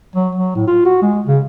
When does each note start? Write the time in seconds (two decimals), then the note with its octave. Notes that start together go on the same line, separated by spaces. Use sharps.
0.16 F#3
0.35 F#3
0.56 A2
0.67 F4
0.85 F#4
1.02 G#3
1.26 C#3